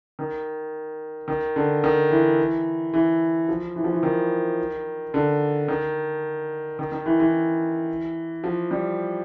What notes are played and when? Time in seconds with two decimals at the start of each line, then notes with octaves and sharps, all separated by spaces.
0.19 D#3
1.28 D#3
1.56 D3
1.84 D#3
2.11 E3
2.94 E3
3.49 F3
3.76 E3
3.84 F3
3.93 E3
4.03 D#3
5.14 D3
5.68 D#3
6.79 D#3
6.92 D#3
7.06 E3
7.20 E3
8.44 F3
8.71 G3